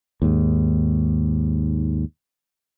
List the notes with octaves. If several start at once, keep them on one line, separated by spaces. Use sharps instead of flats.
D#2 G#2